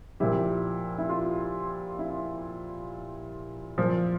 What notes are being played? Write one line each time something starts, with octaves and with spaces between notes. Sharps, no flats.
A#2 F3 E4 G4
E4
F4
E4
A#2 F3